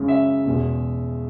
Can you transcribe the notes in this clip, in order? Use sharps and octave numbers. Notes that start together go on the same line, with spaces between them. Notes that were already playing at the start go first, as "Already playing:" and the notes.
Already playing: F#2 C#3 G#3
E5
E2 B2 G#3